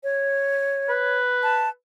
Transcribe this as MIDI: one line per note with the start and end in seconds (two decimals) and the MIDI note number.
0.04 1.19 73
0.89 1.69 71
1.43 1.69 81